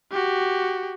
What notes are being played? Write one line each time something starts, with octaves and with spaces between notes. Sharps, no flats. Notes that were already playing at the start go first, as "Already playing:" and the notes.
F#4 G4